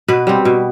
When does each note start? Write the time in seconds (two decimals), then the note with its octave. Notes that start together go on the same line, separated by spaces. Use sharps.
0.08 B2 B4
0.27 G3 C4
0.45 B2